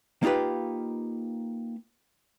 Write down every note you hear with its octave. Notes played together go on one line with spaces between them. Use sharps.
A#3 D#4 F4 G4 B4